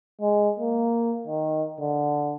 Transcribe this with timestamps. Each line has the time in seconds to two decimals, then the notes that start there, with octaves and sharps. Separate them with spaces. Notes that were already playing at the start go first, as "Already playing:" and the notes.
0.21 G#3
0.59 A#3
1.27 D#3
1.80 D3